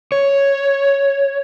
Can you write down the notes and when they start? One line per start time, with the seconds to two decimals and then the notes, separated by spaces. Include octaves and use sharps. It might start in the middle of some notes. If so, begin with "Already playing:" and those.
0.12 C#5